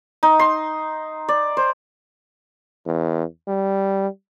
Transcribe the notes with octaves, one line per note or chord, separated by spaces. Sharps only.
D#4
C6
D5
C5
E2
G3